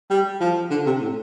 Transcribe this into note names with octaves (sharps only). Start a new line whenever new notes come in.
G3
F3
D3
C3
A2